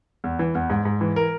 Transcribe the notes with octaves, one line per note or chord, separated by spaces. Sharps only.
E2
E3
E2
G#2
G#2
E3
A#4